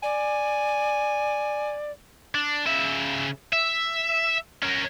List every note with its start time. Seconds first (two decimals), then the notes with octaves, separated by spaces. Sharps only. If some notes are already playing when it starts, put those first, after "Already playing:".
0.03 D5 G#5
2.35 D4
2.66 C#3 E5
3.53 E5
4.62 C#4 A#4